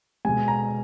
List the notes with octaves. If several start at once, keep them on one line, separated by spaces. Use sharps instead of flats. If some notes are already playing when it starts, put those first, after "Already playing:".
B2 G#3 G#5
A#5